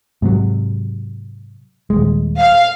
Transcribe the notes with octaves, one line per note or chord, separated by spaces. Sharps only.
G#2 C3 F#3
D#1 C#2 G#3
F5